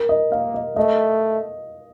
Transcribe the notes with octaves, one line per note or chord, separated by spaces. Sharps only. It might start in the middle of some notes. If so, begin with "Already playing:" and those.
Already playing: A#4
D#5
A#3 F5
D#5
A3 D#5